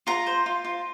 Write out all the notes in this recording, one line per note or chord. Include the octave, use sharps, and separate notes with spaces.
F4 A#5
C5
F4
F4